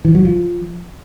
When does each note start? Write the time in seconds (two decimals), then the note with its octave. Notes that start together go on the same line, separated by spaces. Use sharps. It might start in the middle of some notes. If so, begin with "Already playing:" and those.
0.05 E3
0.15 F#3
0.25 F3